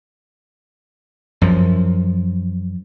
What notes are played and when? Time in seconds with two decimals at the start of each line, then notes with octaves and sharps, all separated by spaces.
1.42 F#2 F3